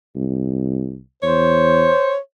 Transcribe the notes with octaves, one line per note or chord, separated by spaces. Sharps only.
C2
E2 C5 C#5